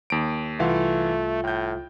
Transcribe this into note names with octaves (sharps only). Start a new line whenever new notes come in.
D#2 D7
C2 E3 A3 F4 F5 F#5
A2 G5 G6